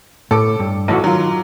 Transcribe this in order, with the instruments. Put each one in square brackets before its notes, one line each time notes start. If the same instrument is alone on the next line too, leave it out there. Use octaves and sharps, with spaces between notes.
[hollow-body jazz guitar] A2 [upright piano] A4 D6
[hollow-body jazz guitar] G2
[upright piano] B1 [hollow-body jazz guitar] A2 E3 F#4
[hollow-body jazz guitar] D#3 F4 [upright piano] F#3